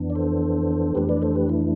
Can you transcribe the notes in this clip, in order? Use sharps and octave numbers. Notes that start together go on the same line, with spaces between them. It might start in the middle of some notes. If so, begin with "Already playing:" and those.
Already playing: F2 E3 B3 D4
D5
A4 C5
F2 E3 A3 D4 G4 B4
B4 D5
A4 C5
G4 B4
E4